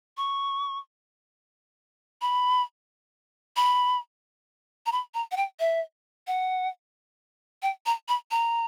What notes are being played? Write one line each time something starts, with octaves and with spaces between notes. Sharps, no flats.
C#6
B5
B5
A#5
B5
A#5
F#5
G5
E5
F#5
G5
A#5
B5
A#5